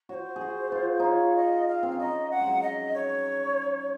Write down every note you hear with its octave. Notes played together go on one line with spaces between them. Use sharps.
F#4 C5 C#5
G#4
F#4
F4
D#4 F4 C#5
D#5
F5
C4
C#4
D#4 D#5
F#5
G#3
F#3
D#5
C#5